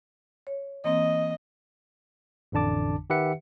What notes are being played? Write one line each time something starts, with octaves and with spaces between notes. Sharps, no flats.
C#5
E3 A#3 C4 D#5
A1 F2 D3 D4 A5 D6
D#3 G4 B4 E5 F#5 C#7